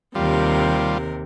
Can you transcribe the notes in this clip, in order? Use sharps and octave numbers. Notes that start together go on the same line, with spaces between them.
D#2 C3 G3 F4 A#4